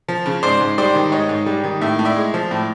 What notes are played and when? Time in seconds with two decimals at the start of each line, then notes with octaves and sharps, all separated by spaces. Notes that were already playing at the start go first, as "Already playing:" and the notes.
0.08 F3
0.26 C#3
0.43 G#2 C5 D5
0.60 G#2
0.78 G3 C5 D5
0.95 D#3
1.12 G#2 C#5 D#5
1.29 G#2
1.46 G3
1.64 D#3
1.81 A2 E5
1.99 A2
2.05 D5 E5
2.16 G#3
2.34 F3
2.51 A2